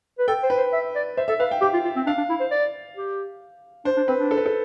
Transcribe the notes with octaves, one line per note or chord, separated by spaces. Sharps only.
B4
A4 G5
C5
B4
C5
E5
D5
C5 E5
A4 E5
B4 F5
G5
G4 G5
F4
F4
C4
D4 F5
D4
E4
C5
D5
G4
D4 C5
D4
C4 B4
D4
A4
B4
A4